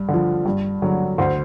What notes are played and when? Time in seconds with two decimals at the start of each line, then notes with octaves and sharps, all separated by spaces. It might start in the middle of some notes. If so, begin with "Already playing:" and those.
Already playing: G2
0.08 D3 F3
0.46 G2
0.82 D3 F#3
1.18 D2 C5